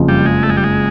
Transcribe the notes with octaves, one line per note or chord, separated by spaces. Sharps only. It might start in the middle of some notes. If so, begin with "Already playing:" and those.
Already playing: F#1 F2 C#3 F3
G3
G#3
A3
G#3
G3
G#3